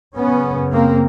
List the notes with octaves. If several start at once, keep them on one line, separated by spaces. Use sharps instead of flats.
F#2 C#3 B3 C#4
A#3 C4